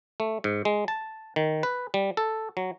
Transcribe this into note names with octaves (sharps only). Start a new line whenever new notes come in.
A3
G#2
G#3
A5
D#3
B4
G3
A4
F#3